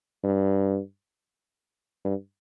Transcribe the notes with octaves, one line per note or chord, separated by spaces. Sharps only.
G2
G2